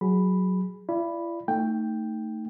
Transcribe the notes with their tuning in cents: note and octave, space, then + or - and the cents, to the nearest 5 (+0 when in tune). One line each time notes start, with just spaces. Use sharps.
F#3 +0 G#4 +0 B5 +0
E4 +45 D5 +0 B5 +0
A3 +20 D#4 +0 G5 +0